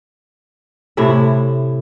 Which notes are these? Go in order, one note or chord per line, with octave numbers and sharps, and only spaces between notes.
A2 C3 E4 E5